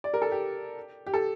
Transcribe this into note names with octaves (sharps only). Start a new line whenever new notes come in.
D5
A#4
A4
G4
G4
A4